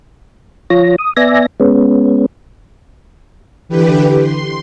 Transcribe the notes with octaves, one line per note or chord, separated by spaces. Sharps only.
F3 F4 C#5 A#6
D#6
B3 D5 E5 G#5 A#6
G#3 B3 C#4
D3 E3 G4 B4
C6